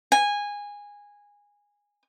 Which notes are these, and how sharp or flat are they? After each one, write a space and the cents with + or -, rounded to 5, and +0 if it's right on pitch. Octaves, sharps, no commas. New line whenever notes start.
G#5 -15